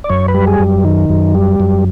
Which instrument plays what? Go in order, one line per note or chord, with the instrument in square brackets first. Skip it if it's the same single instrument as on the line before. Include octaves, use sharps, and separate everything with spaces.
[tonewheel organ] D5
F#2 C#5
B4
G3
G#4
F#2
D#3
F#2
G3
F#2